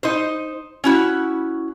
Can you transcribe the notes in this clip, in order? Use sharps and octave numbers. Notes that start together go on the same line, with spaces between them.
D#4 C5
C#4 E4 F#4